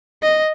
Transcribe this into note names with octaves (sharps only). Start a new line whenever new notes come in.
D#5